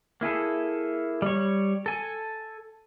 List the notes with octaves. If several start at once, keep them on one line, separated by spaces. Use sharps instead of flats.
A#3 E4 G#4 A4
G3 C#5
A4 G#5